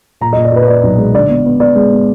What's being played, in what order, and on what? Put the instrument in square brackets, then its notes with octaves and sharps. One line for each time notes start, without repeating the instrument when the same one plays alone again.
[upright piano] A#2 A#5
A#2 D#5
D5
A#2 B4
B4
A#2 D5
B1
G#3
D3 D5
B3
B3
B3 D5
G#3
B3